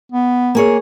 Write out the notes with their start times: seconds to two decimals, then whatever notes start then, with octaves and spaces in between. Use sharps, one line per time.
0.12 B3
0.55 A#3 G#4 C#5